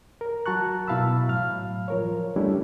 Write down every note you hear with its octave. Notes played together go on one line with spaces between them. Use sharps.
A#4
F#3 F#4 A5 A#5 C#6 F#6
B2 E4 F5 A5 B5 E6
A2 F#3 F5 F6
F3 A#4 C#5
G3 A3 C#4 D4 E4 G4